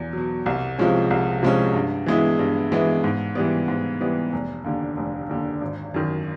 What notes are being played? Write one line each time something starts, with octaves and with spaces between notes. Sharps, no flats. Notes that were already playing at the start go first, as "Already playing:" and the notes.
Already playing: E2 B2
B2 F#3
C2
C3 F3 G#3 C#4
C2
C3 F3 G#3 C#4
G2
E3 G#3 B3 E4
G2
E3 G#3 B3 E4
G#2
E3 G3 B3
G#2
E3 G3 B3
F1
D#2 D3
F1
D#2 D3
G#1
F#2 D#3